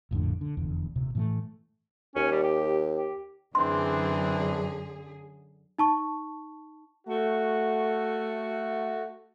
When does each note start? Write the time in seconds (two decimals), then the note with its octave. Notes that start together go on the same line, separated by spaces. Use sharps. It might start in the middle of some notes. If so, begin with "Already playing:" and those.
0.11 A#1 F2 A2 D3
0.41 D3
0.57 F1 E2 D3
0.96 D#1 C3
1.15 A2 E3 A3
2.16 D#2 C#4
2.32 G3
2.43 G4
2.95 G4
3.55 F#2 D3 E3 C4 D4 G#4 C6
5.78 D#4 A5 C#6
7.08 A3 F#4